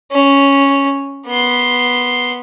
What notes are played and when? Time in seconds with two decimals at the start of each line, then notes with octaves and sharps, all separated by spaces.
0.12 C#4
1.27 B3 C6